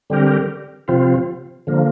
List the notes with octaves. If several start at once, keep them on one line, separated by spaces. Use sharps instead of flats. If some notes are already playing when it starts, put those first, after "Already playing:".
D3 G3 C4 G4 A#4
C3 F3 C4 F4
D3 F3 A#3